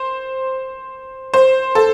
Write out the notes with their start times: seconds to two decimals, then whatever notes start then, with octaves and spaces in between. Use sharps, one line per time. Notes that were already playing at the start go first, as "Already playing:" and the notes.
Already playing: C5
1.34 C5
1.75 A4